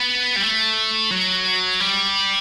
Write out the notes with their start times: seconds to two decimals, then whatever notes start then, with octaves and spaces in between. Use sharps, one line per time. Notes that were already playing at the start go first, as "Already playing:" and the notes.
Already playing: B3
0.36 G3
0.43 A3
1.11 F#3
1.80 G3